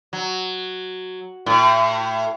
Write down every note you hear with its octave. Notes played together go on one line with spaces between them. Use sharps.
F#3
A2